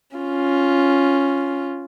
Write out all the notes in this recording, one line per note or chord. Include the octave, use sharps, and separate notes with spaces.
C#4 F4